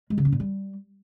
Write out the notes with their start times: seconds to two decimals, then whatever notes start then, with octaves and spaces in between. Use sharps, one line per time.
0.10 G#3
0.18 C#3
0.25 C#4
0.32 A#2
0.40 G3